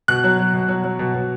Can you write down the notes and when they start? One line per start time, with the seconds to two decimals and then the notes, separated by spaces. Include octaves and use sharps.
0.08 B2 F#6
0.24 F#3
0.39 F#3
0.54 B2
0.69 F#3
0.84 F#3
0.99 B2
1.14 B2